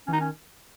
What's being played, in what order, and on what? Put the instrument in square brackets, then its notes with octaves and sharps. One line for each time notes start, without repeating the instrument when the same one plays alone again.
[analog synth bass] E3 [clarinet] C#4
[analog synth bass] D#3 [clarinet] D#4
[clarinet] C#4